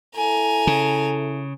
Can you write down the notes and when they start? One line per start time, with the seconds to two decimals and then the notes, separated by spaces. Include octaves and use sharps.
0.16 E4 A4 G#5 A#5
0.67 C#3